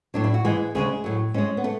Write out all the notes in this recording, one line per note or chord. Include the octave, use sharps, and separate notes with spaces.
A2 F#3 D4
E4
F#4
G#2 E3 G#3 G#4
D2 C#3 G#3 G#4
A2 F#3
G#2 G#3 C#4
B3
A3